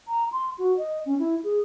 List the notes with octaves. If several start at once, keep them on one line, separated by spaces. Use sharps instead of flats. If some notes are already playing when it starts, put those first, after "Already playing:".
A#5
C6
F#4
D#5
C#4
E4
G#4